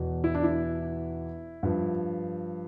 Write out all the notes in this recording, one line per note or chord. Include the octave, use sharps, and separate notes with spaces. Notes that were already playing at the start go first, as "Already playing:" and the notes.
Already playing: E2 B2
E4
D4
E4
G2 F3